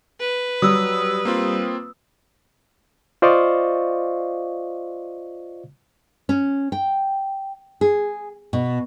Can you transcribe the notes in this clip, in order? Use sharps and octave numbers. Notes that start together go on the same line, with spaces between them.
B4
F#3 G3 D#6 E6
A#3 C4 F4
F4 C5 D5 D#5 F5 C#6
C#4
G5
G#4
B2